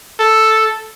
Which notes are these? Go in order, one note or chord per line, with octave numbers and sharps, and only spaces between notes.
A4